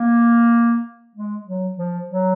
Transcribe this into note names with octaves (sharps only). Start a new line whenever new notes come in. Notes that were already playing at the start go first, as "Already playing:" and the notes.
Already playing: A#3
G#3
F#3
F3
F#3